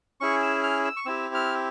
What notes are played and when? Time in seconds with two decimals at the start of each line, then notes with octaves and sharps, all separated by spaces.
0.21 C#4 E4 G#4 C#6
0.43 E6
0.63 F6
0.85 E6
0.96 C#6
1.06 C4 E4 G4 E6
1.35 F6